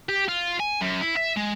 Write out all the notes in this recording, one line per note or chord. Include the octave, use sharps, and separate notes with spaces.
G4
F4
G#5
F#2
E4
E5
G#3